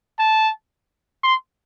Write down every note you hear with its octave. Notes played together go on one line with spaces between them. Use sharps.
A5
C6